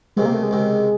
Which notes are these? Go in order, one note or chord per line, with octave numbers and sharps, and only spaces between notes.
C#2 C3 D#3 G#3
A#3
A3
G#3
C#2 C3 D#3